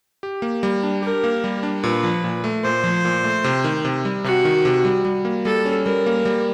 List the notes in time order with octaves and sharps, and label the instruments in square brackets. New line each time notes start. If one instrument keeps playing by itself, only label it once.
[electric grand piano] G4
A#3
G3
D4
[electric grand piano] G4 [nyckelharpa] A#4
[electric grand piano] A#3
G3
D4
[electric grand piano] A#2 [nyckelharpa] B4
[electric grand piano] F3
A#2
A3
[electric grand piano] A#2 [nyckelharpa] C5
[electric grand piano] F3
A#2
A3
C3
D#3
C3
G3
[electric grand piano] C3 [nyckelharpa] F#4
[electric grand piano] D#3
C3
G3
G3
A#3
[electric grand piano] G3 [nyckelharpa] A4
[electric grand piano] C#4
[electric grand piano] G3 [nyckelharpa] A#4
[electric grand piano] A#3
G3